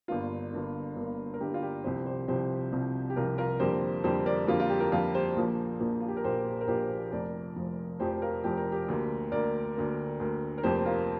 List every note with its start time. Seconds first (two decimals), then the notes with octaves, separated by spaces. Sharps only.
0.08 G1 G2 D3 A#3 F4
0.52 G1 G2 D3 A#3
0.96 G1 G2 D3 A#3
1.34 A#4
1.40 G1 G2 D3 A#3 G4
1.54 F4
1.62 G4
1.84 C2 C3 F3 G4 C5
2.06 G4 C5
2.28 C2 C3 F3 G4 C5
2.72 C2 C3 F3
3.10 G4
3.16 C2 C3 F3 F4 A#4
3.38 F4 A#4
3.60 F2 D3 G3 A#3 G4 C5
4.04 F2 D3 G3 A#3 G4 C5
4.26 A#4 D5
4.48 F2 D3 G3 A#3 F4
4.60 F4
4.70 G4
4.80 F4 A#4
4.92 F2 D3 G3 A#3 F4 A#4
5.15 G4 C5
5.36 A#1 A#2 F3 A#3
5.80 A#1 A#2 F3 A#3
6.00 F4
6.08 G4
6.17 A#4
6.24 A#1 A#2 F3 A#3 G4 C5
6.61 A#4
6.68 A#1 A#2 F3 A#3 G4 C5
7.12 F1 F2 F3 A#4 D5
7.56 F1 F2 F3
7.99 F1 F2 F3 G4 C5
8.22 F4 A#4
8.44 F1 F2 F3 G4
8.57 A#4
8.72 G4
8.88 D2 D3 A#3
9.32 D2 D3 A#3 A#4 D5
9.76 D2 D3 A#3
10.20 D2 D3 A#3
10.58 A#4
10.63 F1 F2 F3 A#3 G4 C5
10.85 F4 A#4